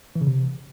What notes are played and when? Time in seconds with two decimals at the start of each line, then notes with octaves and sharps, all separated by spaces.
0.15 E3
0.21 C#3
0.27 C3